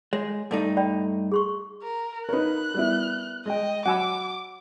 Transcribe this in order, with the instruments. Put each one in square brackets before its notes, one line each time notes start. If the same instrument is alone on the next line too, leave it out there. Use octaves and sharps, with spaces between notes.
[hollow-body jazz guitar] G#3 [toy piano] C#5
[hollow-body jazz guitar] G2 A3 D#4
[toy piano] D5 G5 B5
G#4 C6 C#6
[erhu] A#4
[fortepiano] D#4 C#5 [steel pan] A#4 B4 [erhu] F#6
[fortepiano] G3 B3 E4
[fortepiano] G#3 G5 [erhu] D#5
[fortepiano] F#3 G#5 B5 [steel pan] F#5 E6 [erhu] D6